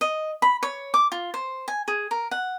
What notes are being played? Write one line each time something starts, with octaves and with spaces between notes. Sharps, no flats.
D#5
B5
C#5
D6
F4
C5
G#5
G#4
A#4
F#5